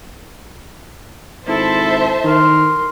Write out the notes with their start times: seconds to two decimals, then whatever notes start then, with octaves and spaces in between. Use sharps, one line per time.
1.47 G#1 E4 A4 C5 E5 A5
2.24 D#3 A#4 C6